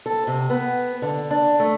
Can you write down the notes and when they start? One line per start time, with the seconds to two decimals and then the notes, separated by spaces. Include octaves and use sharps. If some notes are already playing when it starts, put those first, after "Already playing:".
0.06 A4
0.27 C3
0.50 B3
1.02 D3
1.31 D4
1.60 A3